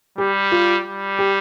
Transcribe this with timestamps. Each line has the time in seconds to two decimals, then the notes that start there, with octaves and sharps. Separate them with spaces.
0.18 G3 G4
0.52 F4
0.85 G3
1.19 G4